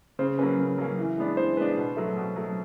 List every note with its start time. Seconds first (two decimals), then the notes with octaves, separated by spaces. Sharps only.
0.19 C#3 C5
0.39 F#3 A#3 C#4 B4
0.59 C#3
0.78 F#3 A#3 C#4
0.98 E3
1.17 G#3 B3 D4
1.37 E3 C5
1.57 G#3 B3 D4 B4
1.77 B2
1.96 F#3 A3
2.16 B2
2.36 F#3 A3